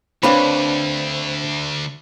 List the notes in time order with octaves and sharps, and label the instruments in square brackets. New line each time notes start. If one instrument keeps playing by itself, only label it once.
[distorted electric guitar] D2 [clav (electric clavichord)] C4 F5 [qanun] D4 B4 C#5 [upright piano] B5